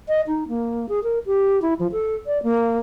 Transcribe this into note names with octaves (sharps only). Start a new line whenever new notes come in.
D#5
D#4
A#3
G#4
A#4
G4
E4
F3
A4
D5
A#3